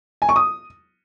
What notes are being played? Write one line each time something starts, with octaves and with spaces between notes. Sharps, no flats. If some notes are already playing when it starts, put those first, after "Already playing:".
G#5
C#6
D#6